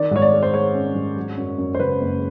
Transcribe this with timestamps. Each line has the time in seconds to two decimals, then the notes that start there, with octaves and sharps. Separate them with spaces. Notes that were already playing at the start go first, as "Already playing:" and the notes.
Already playing: D#3 D5
0.11 G#2 C#5
0.22 D5
0.33 G#3
0.43 C5
0.53 G#3 C#5
0.74 C#4
0.95 G#2
1.16 F#3
1.37 F#2
1.58 F#2
1.75 C5
1.80 C#3 B4
2.01 F#1